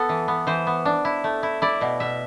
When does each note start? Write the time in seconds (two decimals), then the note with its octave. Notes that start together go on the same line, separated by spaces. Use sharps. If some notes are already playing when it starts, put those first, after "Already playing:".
Already playing: B3 A4
0.09 E3
0.28 B3
0.47 E3 C5
0.67 B3
0.85 D4
1.05 E4
1.24 A3
1.43 E4
1.62 E4 D5
1.81 B2
2.00 B2 E5